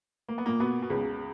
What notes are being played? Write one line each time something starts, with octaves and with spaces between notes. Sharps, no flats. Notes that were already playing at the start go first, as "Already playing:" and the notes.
A#3
B3
A#2 A#3
B2 B3
B2
C#2 C#3